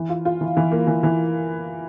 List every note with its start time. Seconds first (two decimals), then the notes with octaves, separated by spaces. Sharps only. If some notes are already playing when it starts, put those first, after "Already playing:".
Already playing: E3
0.09 F4
0.25 F4
0.41 E3
0.57 E3
0.72 A#3
0.87 E3
1.03 E3